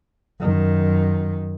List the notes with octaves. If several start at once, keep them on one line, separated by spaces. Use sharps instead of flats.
F#2 D#3